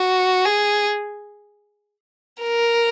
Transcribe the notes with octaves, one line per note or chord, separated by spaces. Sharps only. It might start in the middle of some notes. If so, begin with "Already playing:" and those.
Already playing: F#4
G#4
A#4